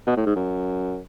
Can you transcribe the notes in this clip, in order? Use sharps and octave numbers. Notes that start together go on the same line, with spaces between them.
B2
A2
G#2
F#2